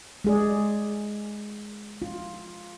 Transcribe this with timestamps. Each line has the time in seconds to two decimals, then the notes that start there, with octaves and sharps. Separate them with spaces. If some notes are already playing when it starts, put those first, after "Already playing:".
0.24 G#3 G#4 D5
2.02 F4